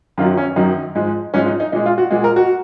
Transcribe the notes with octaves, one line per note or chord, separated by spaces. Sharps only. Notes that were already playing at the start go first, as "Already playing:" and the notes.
F#2 D#3 F#3 F4
C#4
F#2 D#3 F#3 D#4
G#2 F3 G#3
G#2 F3 G#3 C#4
D#4
D#4
A#2 G#3 D#4
F4
F#4
A#2 G#3
A#4
F#4